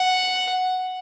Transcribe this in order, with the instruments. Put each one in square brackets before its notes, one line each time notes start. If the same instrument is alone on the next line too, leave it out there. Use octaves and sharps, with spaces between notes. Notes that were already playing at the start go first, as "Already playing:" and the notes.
Already playing: [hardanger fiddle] F#5